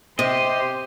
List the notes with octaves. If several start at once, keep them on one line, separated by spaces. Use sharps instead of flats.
C3 G4 C5 D#5 C6